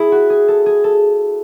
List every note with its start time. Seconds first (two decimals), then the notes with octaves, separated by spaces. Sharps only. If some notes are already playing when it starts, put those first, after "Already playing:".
Already playing: E4 G#4
0.12 F#4
0.30 G#4
0.48 A4
0.66 G#4
0.84 A4